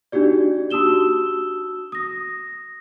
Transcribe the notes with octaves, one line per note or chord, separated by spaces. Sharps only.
D4 D#4 F#4 G4 D5
F#4 A5 D#6 E6 E7 G7
D#6 A#6